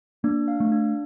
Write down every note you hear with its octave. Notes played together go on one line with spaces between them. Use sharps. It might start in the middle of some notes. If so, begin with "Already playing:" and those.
A#3 D4
F5
A3
D4